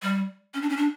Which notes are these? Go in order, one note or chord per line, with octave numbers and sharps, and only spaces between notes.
G3
C#4
D4
C#4
D4